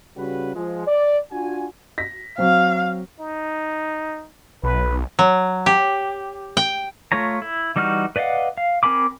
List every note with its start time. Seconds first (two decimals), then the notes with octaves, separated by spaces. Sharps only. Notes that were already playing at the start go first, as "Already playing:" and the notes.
0.17 C#3 G3 F#4 B4
0.55 F3 G#3
0.87 D5
1.32 D4 F4 F#4 G#5
1.98 A#6 B6
2.38 F#3 C4 F5
3.20 D#4
4.63 B1 B4
5.19 F#3
5.66 G4
6.57 G5
7.12 A3 F4 C#5 A#5
7.42 E4
7.76 E3 G3 D#4 F#4 F6
8.16 B4 D5 D#5 F5 F#5
8.58 F5
8.83 C4 A#4 G#5 B5 D6